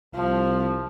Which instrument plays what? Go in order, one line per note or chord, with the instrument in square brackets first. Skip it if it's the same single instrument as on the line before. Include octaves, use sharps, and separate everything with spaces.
[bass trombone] C2 [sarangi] F3